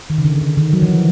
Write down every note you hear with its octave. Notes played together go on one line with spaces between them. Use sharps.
D#3
C#3
D3
D3
D#3
F#3
E3
F3